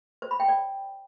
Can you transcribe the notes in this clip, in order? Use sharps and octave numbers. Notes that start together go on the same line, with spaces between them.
C5
B5
G5
D5